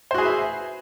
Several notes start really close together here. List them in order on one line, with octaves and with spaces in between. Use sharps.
C5 F#4 G#4 B4 E5